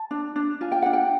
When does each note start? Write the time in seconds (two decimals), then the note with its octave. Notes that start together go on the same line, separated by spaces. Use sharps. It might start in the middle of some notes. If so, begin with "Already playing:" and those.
Already playing: A5
0.11 D4
0.36 D4
0.61 F4 G#5
0.72 G5
0.82 D4 F#5
0.93 G5